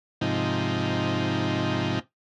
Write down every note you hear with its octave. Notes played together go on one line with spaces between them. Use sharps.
G#2 C3 F3 D#4